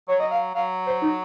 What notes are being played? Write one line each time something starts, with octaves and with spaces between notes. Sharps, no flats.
F#3 C#5
D#5
F5
F#3 F5
C5
D#4